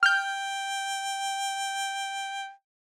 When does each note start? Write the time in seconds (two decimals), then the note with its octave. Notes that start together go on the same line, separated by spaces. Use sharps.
0.03 G5 F6 G6